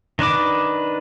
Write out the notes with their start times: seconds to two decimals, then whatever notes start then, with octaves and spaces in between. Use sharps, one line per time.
0.19 D#3 D4 B4 D6